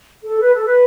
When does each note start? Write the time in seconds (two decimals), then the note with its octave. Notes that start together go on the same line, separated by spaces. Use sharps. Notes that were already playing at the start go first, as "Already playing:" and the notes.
0.24 A4
0.40 B4
0.53 A4
0.65 B4